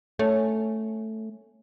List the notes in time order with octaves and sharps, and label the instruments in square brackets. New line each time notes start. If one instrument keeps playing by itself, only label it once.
[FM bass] A3 [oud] C#4